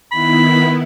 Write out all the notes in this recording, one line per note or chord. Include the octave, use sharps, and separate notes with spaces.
D#3 B3 E4 B5